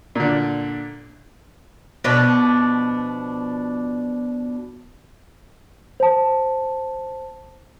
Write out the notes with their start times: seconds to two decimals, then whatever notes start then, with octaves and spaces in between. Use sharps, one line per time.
0.15 A#2 D3
2.04 B2 F3 B3 D4
6.00 C5 A5